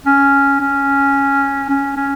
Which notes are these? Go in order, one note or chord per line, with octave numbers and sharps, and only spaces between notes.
C#4
C#4
C#4
C#4